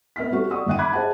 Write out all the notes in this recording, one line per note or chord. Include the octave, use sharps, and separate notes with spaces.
B3 E5 F6 B6
G3 C4 F#4 G4 A4
D5 F#5 C#6 D#6 E6
G1 E5 F#5 D#7
B5 D6 F#6 G#6
G#4 C5 D#5 E5 F#5 A5